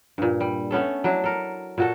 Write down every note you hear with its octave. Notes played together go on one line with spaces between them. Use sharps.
G2 A#2
G3
A3 B3 C#4 A4
F#3 D4 E4
A4 A#4
A#2 F#4 A4